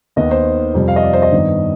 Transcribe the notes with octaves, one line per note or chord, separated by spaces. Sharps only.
D#2 D#3 B3 D#5
C5
F2 C3 G3
F5
D#5
D5
C5
D#5
G2 D#3 B3